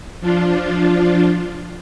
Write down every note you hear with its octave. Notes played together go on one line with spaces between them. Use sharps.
F3 D4 F4